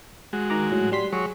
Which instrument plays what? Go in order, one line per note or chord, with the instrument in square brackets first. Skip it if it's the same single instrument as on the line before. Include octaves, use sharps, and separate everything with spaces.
[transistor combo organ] G#3 F#4
[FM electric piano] D#3 A#5 D6
A2 F#3
G3 C6 B6
[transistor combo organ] F#3 C#5 [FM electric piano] G#4